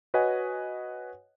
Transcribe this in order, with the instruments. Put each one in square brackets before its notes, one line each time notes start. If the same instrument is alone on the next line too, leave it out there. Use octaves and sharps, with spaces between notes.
[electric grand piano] F#4 B4 C#5 D#5 F#5 G#5